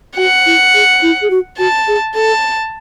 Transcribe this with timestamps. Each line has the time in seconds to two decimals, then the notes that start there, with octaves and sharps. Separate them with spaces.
0.17 F#4 F#5
0.46 E4
0.74 G#4
1.02 E4
1.22 G#4
1.30 F#4
1.59 F#4 A5
1.88 G#4
2.15 A4 A5